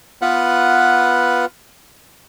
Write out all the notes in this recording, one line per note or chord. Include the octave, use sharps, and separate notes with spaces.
B3 F4 B4 F#5